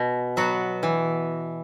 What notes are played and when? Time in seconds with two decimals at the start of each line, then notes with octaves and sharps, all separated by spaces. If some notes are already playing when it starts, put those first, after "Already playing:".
Already playing: B2
0.37 F#3 B3 F#4
0.83 E3